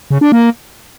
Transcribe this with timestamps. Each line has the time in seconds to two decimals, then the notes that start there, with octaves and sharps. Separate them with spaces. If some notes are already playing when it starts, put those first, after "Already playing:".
0.11 C#3
0.21 D4
0.32 A#3